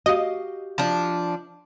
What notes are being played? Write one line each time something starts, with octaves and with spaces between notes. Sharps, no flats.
F#4 G4 D#5 F5
F3 D4